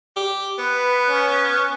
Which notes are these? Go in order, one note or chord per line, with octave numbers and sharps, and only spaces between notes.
G4
B3 B4
C#4